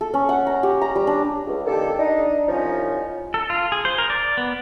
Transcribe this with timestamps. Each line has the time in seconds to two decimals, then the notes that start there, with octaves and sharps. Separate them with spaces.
0.01 A4
0.14 C#4
0.29 F#5
0.47 A#5
0.63 G4
0.81 A#5
0.96 G3
1.07 D4
1.46 C#2
1.66 D#3 A#3 D4 G4 A4
1.99 D4 D#4
2.48 C2 F3 C#4 D#4
3.34 A4
3.50 F4
3.72 G#4
3.85 C5
3.98 A#4
4.10 D5
4.37 B3